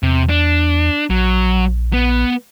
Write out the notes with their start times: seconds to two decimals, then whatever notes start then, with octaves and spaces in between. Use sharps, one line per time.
0.03 E2 C3
0.29 D4
1.10 A#1 F#3
1.93 B3